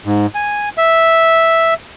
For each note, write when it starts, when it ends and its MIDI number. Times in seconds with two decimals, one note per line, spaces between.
0.05 0.26 44
0.35 0.69 80
0.78 1.74 76